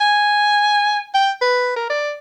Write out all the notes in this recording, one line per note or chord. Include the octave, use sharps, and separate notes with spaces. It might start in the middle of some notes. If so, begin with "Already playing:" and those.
G#5
G5
B4
A#4
D5